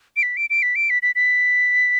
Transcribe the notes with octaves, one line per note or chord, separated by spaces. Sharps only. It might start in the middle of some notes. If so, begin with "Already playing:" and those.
D7
B6
D7
D7
B6
D7
B6
B6
B6